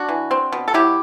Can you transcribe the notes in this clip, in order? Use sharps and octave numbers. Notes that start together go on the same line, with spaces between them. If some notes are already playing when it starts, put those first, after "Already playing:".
Already playing: D4 F#4
E3
C4
B2
A4
F#3 E4 G4